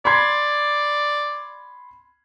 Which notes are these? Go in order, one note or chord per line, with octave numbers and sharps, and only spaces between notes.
D5 B5 C6 G#6